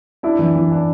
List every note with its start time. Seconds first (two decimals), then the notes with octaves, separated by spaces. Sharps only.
0.23 D4 E4
0.39 E3
0.55 E3
0.71 D4